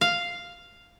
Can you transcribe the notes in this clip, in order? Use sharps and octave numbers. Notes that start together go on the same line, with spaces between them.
F5